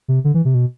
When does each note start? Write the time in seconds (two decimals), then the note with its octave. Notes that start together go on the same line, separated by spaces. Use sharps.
0.08 C3
0.24 D3
0.34 E3
0.45 C3
0.55 B2